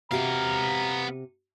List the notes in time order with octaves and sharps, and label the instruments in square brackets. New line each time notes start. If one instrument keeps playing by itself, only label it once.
[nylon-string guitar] C3 F#4 G4 [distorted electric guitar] B3 F5 [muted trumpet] A#5